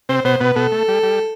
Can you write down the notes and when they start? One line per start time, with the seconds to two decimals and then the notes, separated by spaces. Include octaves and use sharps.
0.09 C3 C4 C5
0.24 B2 B3 C5
0.40 B2 B3 B4
0.56 B2 B3 A4
0.72 A3
0.88 G3
1.03 G3